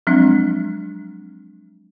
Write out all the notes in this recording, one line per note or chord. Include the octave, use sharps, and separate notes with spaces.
F3 F#3 G#3 C4 D4